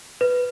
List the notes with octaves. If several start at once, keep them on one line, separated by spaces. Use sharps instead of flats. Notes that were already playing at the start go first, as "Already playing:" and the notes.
B4